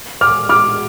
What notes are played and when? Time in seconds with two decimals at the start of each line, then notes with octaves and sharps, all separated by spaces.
0.21 D6 F6
0.49 D6 F6